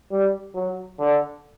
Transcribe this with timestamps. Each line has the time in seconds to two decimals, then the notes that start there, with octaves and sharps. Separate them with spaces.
0.11 G3
0.55 F#3
0.99 D3